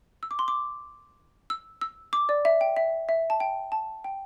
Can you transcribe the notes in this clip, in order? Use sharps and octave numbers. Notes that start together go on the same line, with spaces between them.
E6
D6
C6
D6
E6
E6
D6
D5
E5
G5
E5
E5
A5
G5
A5
G5